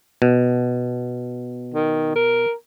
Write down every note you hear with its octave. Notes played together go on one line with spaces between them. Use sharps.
B2
D#3
A#4